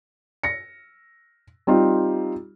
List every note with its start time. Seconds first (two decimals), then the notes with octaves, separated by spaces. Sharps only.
0.43 A#6 C#7
1.67 G3 C4 D#4 F4